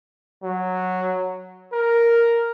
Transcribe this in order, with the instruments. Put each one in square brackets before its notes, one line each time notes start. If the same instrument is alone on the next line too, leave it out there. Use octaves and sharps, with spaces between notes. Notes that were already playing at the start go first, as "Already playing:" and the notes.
[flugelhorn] F#3
A#4